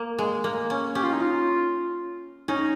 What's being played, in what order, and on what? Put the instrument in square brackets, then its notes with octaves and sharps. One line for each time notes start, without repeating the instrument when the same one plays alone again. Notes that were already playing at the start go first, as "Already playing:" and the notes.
Already playing: [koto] A#3
G#3
A#3
C#4
[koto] C#4 [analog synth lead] G4
[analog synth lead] F4
D#4
F4
[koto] C#4 [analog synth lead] D#4